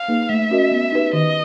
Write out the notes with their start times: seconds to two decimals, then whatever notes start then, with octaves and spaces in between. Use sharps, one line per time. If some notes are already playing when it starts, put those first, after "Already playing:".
Already playing: F5
0.08 A#3 D#4 G#4 B4
0.29 A3 E5
0.50 C#4 F#4 A#4 D#5
0.72 B3
0.92 D#4 G4 B4
1.13 D#3 D#5